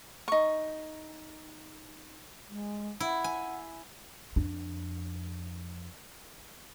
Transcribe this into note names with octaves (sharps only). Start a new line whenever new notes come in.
D#4 C#6
G#3
E4 F#5
G#5
F2 D4